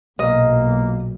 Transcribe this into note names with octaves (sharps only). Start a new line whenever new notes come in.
B1 A#2 A#3 D#5